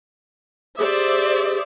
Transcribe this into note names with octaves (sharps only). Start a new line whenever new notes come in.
G4 G#4 C5 D5 E5